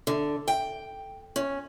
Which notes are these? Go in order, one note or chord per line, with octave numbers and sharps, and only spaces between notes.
D3
G5
C#4